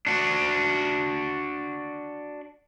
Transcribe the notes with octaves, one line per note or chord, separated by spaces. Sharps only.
D4 F#4